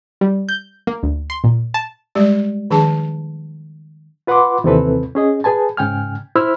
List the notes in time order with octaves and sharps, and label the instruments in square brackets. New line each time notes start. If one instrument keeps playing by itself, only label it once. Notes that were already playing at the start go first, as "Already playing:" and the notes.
[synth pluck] G3
G6
A#3
D2
C6
A#2
A5
[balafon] G3 G#3 G4 D5
D#3 F3 D4 G#4 A5
[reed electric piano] F4 B4 F#5 B5 C6 D6
D#2 C3 E3 C4 A4 B4
C#4 G#4 D#5
G#4 B4 G#5 A5
G#2 C#3 G5 G#5 F6
E4 C5 E5 B5 E6 F6